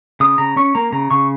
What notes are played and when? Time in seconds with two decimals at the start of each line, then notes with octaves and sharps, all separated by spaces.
0.20 C#3 D#6
0.38 C#3 A#5
0.56 C#4 C#6
0.75 A#3 A#5
0.92 C#3 A#5
1.10 C#3 C#6